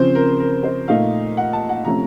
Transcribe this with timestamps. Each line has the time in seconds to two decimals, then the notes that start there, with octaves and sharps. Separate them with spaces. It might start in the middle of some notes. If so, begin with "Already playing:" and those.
Already playing: C#3 F3 C4 C5
0.15 A#4
0.40 A#4
0.63 C5
0.88 A#2 A3 D#4 F5
1.37 F#5
1.53 A5
1.69 F#5
1.85 C3 F3 A3 C#4 A#5